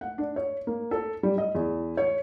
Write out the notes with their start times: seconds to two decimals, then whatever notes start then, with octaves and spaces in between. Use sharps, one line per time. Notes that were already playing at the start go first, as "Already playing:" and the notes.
0.01 F#5
0.18 D4
0.36 C#5
0.67 A#3
0.91 A4
1.23 G3
1.38 D#5
1.55 E2
1.97 C#5